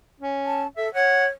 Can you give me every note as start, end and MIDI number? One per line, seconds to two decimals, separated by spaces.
0.20 0.64 61
0.45 0.68 81
0.77 0.92 69
0.77 0.88 76
0.94 1.28 73
0.94 1.25 78